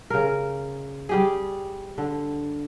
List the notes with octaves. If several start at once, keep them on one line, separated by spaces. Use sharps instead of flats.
C#3 A#4
G3 G4 G#4
D3